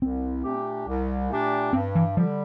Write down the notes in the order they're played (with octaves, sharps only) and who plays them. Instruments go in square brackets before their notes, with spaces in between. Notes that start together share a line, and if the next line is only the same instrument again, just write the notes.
[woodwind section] C2 [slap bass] C4
[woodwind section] A#2 A3 D4 G4
C2
A#2 A3 D4 G4
[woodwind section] G2 [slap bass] C4
[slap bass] E3
[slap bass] F3 [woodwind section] G3
[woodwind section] D3